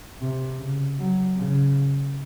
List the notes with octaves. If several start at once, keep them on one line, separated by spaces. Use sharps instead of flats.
C3
C#3
F#3
C#3